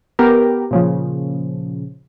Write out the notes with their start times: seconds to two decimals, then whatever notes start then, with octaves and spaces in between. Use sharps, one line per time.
0.19 B3 G4 A#4
0.71 A#2 C#3 F3